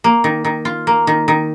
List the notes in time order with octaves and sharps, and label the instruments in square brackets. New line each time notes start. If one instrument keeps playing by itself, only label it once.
[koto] A#3
D#3
D#3
F4
A#3
D#3
D#3